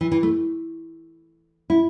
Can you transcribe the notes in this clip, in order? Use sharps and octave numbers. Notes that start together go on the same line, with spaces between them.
E3
E3
A3
E4